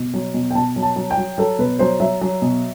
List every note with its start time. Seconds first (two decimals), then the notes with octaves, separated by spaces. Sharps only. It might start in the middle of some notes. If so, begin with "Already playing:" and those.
Already playing: B2
0.14 F#3
0.34 B2
0.50 G5
0.55 B2 A5
0.76 F#3
0.82 A5
0.96 F#3
1.11 G5
1.17 F#3
1.38 F#3 A4
1.59 B2 B4
1.79 F#3 C5
2.00 F#3 E5
2.21 F#3
2.42 B2